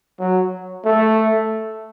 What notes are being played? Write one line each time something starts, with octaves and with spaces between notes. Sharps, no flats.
F#3
A3